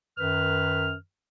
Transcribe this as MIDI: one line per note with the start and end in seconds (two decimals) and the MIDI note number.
0.18 0.93 42
0.18 0.93 51
0.18 0.93 71
0.18 0.93 89